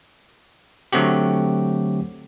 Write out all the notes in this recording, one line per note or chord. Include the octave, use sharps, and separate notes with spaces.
D3 F#3 A3 C4 F#4 G4